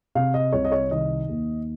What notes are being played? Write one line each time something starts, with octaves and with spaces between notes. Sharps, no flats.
C3 F5
D#5
C2 C#5
D#5
C#5
D#3 D#5
D#2